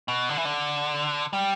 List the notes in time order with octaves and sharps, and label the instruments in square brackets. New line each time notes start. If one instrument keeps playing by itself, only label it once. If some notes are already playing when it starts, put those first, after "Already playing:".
[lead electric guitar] B2
D3
E3
D3
G3